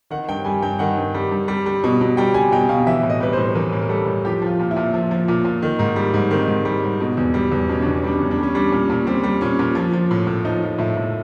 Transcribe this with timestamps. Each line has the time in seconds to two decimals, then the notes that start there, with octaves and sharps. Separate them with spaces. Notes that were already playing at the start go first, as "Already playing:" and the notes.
0.10 D#3 F#5
0.29 G2 G5
0.45 G3 G#5
0.62 G2 G5
0.79 D#3 F#5
0.97 G2
1.14 G3
1.31 G2
1.48 G3
1.66 G3
1.84 B2
2.01 B2
2.17 G3 G5
2.34 G3 G#5
2.52 B2 G5
2.69 B2 F5
2.87 E3 E5
3.03 A2
3.10 D#5
3.20 G3 B4
3.33 C5
3.38 A2
3.55 E3 A#4
3.72 A2
3.82 A#4
3.89 G3 A4
4.06 A2
4.25 F3 G4
4.42 F3 F4
4.59 A#2
4.71 E4
4.76 A#2
4.94 F3
5.11 F3
5.28 A#2
5.45 A#2
5.62 D#3
5.79 G#2
5.96 G3
6.14 G#2
6.31 D#3 C4
6.48 G#2
6.65 G3
6.83 G#2
7.00 B2
7.17 E2
7.34 G3
7.52 E2
7.69 B2 C#4
7.82 E2 D4
7.94 C#4
8.04 G3 D4
8.19 E2 C#4
8.31 D4
8.38 G3 C#4
8.55 G3 D4
8.68 A#2 C#4
8.90 A#2
9.07 G3 C4
9.23 G3
9.41 A#2 C#4
9.59 A#2
9.75 F3
9.93 F3
10.11 A2
10.27 A2
10.45 F3 D#4
10.63 F3
10.79 A2 E4
10.97 A2